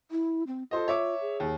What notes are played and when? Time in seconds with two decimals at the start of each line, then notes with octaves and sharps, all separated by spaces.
0.11 E4
0.47 C4
0.71 F4 A4 C5 D#5
0.88 C#5 E5 D6
1.21 G#4
1.40 D#2